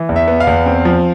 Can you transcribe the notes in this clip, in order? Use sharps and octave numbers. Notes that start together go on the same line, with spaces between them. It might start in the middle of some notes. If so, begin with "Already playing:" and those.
Already playing: E3
E2
E5
B3
F5
E2
C4
F3